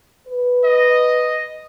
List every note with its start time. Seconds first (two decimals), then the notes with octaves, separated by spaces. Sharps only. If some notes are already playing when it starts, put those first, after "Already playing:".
0.27 B4
0.64 D#5